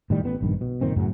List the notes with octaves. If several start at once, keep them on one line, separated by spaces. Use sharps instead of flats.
A2 D#3 G3
A1 B3
A#1 G2 D#3
B2
F#1 A#2 D#3 C4
F#2 A2 C#3 F#3